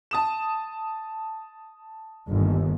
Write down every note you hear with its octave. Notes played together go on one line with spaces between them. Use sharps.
A5 D#6 E7
G1 D#2